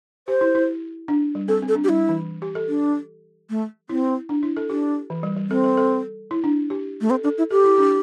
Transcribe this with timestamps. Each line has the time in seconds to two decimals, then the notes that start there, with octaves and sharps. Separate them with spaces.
0.28 G4 C5
0.41 E4
0.55 E4
1.08 D4
1.35 G3
1.48 C4 A4
1.62 C4
1.68 A4
1.75 D4
1.84 G4
1.89 G3 E4
2.09 E3
2.42 G4
2.55 A4
2.68 D4
3.50 A3
3.89 C4 E4
4.29 D4
4.43 E4
4.57 A4
4.70 D4 G4
5.10 E3
5.23 G3
5.36 G3
5.50 C4 A4
5.64 A4
5.77 A4
6.31 E4
6.44 D4
6.70 G4
7.01 A3
7.10 C4 A4
7.24 D4 A4
7.38 E4
7.51 G4 A4
7.64 E4
7.78 D4